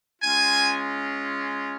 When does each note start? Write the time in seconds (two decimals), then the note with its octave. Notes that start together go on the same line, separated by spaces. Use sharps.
0.22 G#3 C#4 F4 G#5